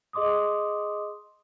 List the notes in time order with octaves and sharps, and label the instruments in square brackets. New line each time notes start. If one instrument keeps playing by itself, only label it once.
[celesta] G#4 D#5 C6 D6 D#6